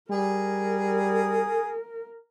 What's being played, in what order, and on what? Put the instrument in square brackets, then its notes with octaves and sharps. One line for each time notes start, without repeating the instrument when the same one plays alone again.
[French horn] G3 [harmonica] G#4 [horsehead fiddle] A#4